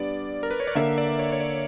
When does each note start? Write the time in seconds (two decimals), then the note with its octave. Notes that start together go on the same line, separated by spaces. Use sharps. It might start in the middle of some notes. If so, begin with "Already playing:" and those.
Already playing: G3 B3 D4 D5
0.43 A#4
0.51 B4
0.60 C#5
0.67 D5
0.75 D3 A#3 D4 A#4 E5
0.98 D5
1.19 C#5
1.32 C#5
1.40 D5